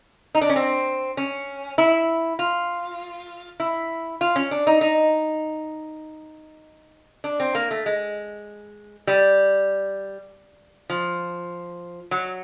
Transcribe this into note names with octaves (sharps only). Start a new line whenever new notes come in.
D#4
D4
C#4
C4
C#4
E4
F4
E4
F4
C#4
D4
D#4
D#4
D4
C4
A#3
A3
G#3
G3
F3
F#3